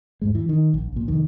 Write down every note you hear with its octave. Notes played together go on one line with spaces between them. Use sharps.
E2 G#2 G#3
E3
D#3
A#1
A#1 A#2
C2 F2 D#3